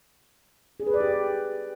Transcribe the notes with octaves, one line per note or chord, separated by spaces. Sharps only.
G#4
B4
D5
G4